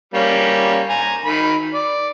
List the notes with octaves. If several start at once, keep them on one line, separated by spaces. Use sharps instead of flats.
G3 A#3 C#4
G#5 A#5
D#3 B5
D5